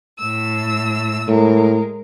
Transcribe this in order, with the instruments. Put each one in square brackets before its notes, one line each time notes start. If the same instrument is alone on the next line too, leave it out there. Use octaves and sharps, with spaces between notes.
[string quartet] A2 E6
[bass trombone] A2 [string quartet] G#3 A#4